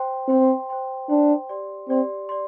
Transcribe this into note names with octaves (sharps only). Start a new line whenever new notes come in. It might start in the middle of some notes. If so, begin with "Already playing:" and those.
Already playing: C5 G5 C6
C4 C5 G5 C6
C5 G5 C6
D4 C5 G5 C6
G4 D5 C6
C4 G4 D5 C6
D5 C6